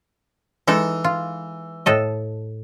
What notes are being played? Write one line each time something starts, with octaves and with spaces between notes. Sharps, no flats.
E3 G#3 D#4 A4
F4
A2 A4 D#5